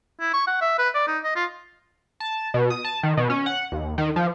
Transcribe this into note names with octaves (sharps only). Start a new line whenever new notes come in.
E4
C#6
F#5
E5
B4
D5
D#4
D#5
F4
A5
B2
D#6
A5
D#3
B2
C#4
F#5
D#2
D#3
F3